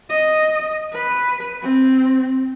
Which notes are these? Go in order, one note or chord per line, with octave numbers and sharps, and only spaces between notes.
D#5
B4
C4